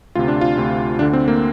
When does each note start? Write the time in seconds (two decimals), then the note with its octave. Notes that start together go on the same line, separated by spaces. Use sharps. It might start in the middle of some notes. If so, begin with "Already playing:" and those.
0.15 D2 C3 F4
0.28 D4
0.41 F4
0.57 D2 C3
0.99 D2 D3 D4
1.13 C4
1.28 A#3